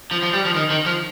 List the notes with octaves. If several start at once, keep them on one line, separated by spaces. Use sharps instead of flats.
F3
F3
G3
F3
D#3
D#3
F3